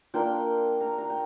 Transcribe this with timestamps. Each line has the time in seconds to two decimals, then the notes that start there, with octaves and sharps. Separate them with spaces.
0.14 A#3 D4 F4 G5
0.80 A#5
0.98 A#5
1.10 G5